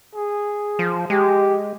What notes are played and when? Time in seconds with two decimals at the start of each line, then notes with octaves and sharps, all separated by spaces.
0.14 G#4
0.79 F3
1.10 G#3 G4